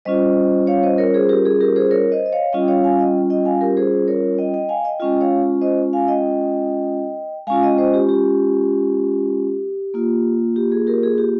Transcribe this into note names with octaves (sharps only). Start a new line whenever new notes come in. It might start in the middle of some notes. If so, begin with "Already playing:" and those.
G3 C#4 F4 C5 D#5
C#5 F5
C5 D#5
A#4 C#5
G#4 C5
G4 A#4
G#4
G4 A#4
G#4 C5
A#4 C#5
C5 D#5
D#5
C#5 F5
G3 C#4 F4 D#5 G5
C#5 F5
F5 G#5
D#5 G5
D#5 G5
F5 G#5
G4 A#4
G#4 C5
A#4 C#5
D#5 G5
D#5 G5
F5 G#5
D#5 G5
G#3 C#4 F4 D#5 G5
C#5 F5
C5 D#5
F5 G#5
D#5 G5
G#3 C#4 F4 F5 G#5
D#5 G5
C5 D#5
G4
G4
A#3 F4
G4
G#4
G4 A#4
G#4
G4